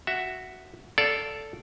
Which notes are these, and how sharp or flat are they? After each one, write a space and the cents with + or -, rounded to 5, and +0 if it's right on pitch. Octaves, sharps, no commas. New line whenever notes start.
F#4 +0 E5 +0
A4 +0 D5 -15 F5 +0